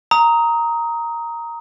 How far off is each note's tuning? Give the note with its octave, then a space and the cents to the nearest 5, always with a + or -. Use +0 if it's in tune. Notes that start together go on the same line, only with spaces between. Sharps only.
A#5 +0 D#6 +20